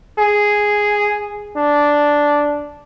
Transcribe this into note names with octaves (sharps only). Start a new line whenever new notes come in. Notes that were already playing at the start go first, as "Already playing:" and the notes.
G#4
D4